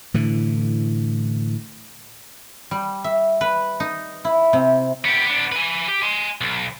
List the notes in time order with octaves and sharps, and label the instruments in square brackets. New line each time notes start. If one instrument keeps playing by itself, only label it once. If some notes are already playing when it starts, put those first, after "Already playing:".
[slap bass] A2 D3 E3
[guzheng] G3
E5
B4
D#4
E4
C3
[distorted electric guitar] B3 G4
B3 D4
B4 G#5
G4
G#5 C6
B1